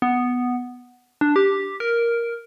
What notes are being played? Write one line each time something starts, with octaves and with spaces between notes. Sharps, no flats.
B3
D4
G4
A#4